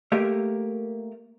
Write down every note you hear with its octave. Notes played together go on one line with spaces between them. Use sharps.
A3 A#3 G4 A#4